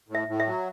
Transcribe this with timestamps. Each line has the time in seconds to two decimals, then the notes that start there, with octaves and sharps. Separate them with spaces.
0.09 A2
0.15 E5
0.28 A2
0.40 E5
0.46 F#3